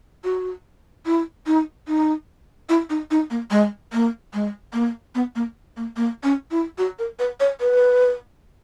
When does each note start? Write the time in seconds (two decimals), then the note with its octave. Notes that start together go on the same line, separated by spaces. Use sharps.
0.24 F#4
1.06 E4
1.47 D#4
1.88 D#4
2.69 E4
2.90 D#4
3.11 D#4
3.31 A#3
3.51 G#3
3.93 A#3
4.34 G#3
4.73 A#3
5.15 B3
5.36 A#3
5.77 A#3
5.97 A#3
6.24 C#4
6.51 E4
6.78 F#4
6.99 A#4
7.19 B4
7.40 C#5
7.60 B4